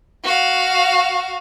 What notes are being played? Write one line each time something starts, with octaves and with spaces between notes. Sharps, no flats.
F#4 F5